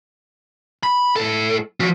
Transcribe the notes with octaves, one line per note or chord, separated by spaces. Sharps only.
B5
A2 A4
F3 F#4